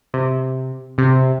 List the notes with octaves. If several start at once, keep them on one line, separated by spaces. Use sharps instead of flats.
C3
C3